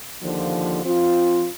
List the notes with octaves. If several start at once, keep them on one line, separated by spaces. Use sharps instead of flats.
D#2 D3 F3
F3 C4 F4